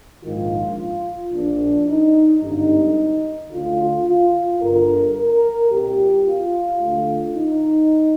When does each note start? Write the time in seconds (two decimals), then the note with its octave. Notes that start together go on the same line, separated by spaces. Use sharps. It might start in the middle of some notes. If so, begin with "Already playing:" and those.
0.23 A#1 G#2 D#3 F4
1.32 A#1 A#2 D4
1.86 D#4
2.41 G#1 G2 D3 D#4
3.50 D2 D3 F4
4.05 F4
4.60 G1 G2 D3 A#4
5.15 A#4
5.70 C2 A#2 G4
6.24 F4
6.79 D2 D3
7.33 D#4